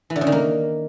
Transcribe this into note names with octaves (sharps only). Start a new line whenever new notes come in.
E3
D3
C#3
D#3
A#3